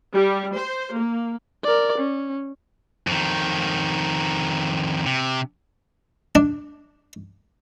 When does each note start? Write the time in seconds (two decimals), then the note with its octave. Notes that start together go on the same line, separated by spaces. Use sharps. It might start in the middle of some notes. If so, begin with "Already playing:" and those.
0.15 G3
0.56 C5
0.95 A#3
1.64 A#4 D5
1.98 C#4
3.07 F2 D#3
5.06 C3
6.35 D4